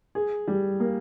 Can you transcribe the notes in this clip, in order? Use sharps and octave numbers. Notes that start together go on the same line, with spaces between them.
G#4
G3
A#3